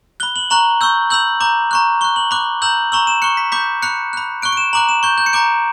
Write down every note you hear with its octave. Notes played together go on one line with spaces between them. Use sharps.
B5 F#6 G7
F#7
A#5 C#6 F#6 F#7
C#6 E6 G6
B5 E6 G6 F#7
A#5 D6 G6
A#5 C#6 F#6
C#6 F#6 G7
F#7
B5 D6 F#6
A#5 E6 G6 F#7
A#5 C#6 E6 F#7
E7
C#6 F#6 C#7
B6
B5 D6 G6 B6
B5 F#6 C#7
B5 F#6
C#6 F#6 D7
D7
E7
A#5 D6 F#6 F#7
E7
C#6 G6
G6
C#7
A#5 D6 G6 D7